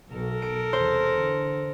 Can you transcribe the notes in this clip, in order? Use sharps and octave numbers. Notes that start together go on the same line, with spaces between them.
B1 A4 A#4
D7
E2 C3 C5
D3